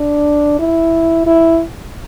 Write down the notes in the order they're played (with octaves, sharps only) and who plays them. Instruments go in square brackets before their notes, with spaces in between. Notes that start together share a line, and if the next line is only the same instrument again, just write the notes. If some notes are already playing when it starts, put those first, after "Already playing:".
Already playing: [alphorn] D4
E4
E4